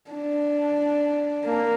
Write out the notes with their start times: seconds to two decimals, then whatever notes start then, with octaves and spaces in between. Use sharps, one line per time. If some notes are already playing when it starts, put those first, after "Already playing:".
0.10 D4
1.45 A#3